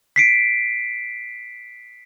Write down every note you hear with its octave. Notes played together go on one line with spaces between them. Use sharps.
B6 C7 D7